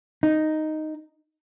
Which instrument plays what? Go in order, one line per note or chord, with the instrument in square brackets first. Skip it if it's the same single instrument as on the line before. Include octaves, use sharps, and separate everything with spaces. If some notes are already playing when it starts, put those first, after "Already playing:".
[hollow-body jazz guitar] D#4